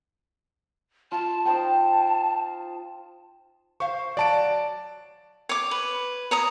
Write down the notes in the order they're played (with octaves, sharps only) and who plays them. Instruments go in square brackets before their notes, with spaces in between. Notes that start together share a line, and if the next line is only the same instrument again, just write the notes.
[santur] F4 [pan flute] A5
[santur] D#4 C5 G5 [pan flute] A5
[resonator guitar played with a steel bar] C5 F5 [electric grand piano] C#6
[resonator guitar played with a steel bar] F#3 [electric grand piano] D5 A5 D7
[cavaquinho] C#5 D6
B4
C#5 A#5 D#6